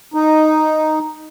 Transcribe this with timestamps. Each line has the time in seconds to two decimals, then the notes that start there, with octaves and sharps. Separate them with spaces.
0.14 D#4